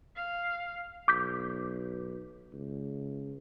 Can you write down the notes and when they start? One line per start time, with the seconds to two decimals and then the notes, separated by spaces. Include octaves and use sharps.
0.16 F5
1.08 B1 D6 G6 B6
2.53 C#2